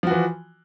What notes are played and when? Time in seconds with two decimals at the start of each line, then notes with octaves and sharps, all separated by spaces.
0.03 F3
0.07 F#4
0.11 E3